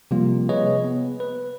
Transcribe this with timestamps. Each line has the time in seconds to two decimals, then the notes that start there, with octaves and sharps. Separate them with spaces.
0.11 C3 F3 G3 A#3 F4
0.49 G#4 B4 C#5 D#5
0.84 B3
1.20 B4